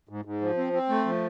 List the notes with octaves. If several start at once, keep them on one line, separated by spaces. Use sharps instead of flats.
G#2
G#2
F3
C4
C4
A3
F3